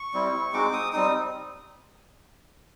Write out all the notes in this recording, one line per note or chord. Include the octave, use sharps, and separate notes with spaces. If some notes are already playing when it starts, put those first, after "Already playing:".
Already playing: C#6
G3 C4 E4
G#3 C4 D#4 F#4 D6
D#6
G3 C4 D#4 D#6